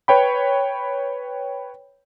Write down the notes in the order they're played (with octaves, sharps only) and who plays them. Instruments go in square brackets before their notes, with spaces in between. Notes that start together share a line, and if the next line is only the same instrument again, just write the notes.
[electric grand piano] B4 C#5 G5 B5